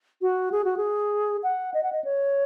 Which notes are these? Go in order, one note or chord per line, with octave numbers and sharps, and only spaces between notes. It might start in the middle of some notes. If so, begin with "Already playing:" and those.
F#4
G#4
F#4
G#4
F#5
D#5
F#5
D#5
C#5